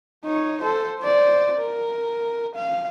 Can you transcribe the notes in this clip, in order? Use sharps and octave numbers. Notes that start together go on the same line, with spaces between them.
D#4 C#5
A4 C5
C5 D5
A#4
F5